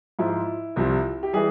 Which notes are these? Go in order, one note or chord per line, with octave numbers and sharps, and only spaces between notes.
G#2 F3 E4
C2 C3 F3
G4
E3 G3 G#4